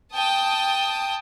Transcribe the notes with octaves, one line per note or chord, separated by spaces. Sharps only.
G5 A5 D#6